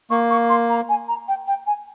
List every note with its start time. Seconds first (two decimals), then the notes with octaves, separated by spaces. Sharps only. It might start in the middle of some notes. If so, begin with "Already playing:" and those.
0.10 A#3 C#6
0.31 C#6
0.49 C6
0.70 A#5
0.89 G#5
1.08 A#5
1.28 G5
1.47 G5
1.67 G#5